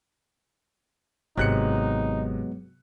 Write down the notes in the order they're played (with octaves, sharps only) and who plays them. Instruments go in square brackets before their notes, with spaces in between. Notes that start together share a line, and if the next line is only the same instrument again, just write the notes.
[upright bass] G#1 [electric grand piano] C3 F#6 C#7 [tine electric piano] F#3 G#3 B3 [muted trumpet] D#4